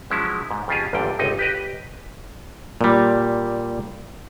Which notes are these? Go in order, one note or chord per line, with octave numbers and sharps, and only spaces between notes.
F3 F#3 G#3 C#4 E4
G#2
F2 C#3 F4 G4 G#4
G1 E2 G2 A#2 G3 G5
G1 C#2 C3 D#4 D#5
G4 B4 D#5
A#2 G3